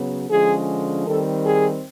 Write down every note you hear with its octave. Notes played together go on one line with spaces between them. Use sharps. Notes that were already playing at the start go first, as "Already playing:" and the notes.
Already playing: C#3 F#3 B3
D3 F3 G#3 C#4 G#4
D#3 G3 C4 A4
G#4